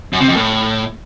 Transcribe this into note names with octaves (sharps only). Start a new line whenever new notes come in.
F#2
C3
F2
A2